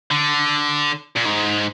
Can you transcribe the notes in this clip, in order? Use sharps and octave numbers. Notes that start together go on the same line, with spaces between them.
D3
A#2
G#2